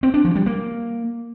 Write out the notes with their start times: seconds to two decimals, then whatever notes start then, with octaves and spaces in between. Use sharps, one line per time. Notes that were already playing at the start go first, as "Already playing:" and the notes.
0.03 C4
0.14 D4
0.25 F3
0.35 G3
0.46 A#3